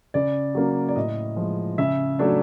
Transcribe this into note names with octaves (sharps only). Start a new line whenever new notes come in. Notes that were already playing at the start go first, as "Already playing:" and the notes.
C#3 D5
F#3 A#3 C#4
D5
A2 D#5
F3 G#3
C#3 E5
F#3 A3 D4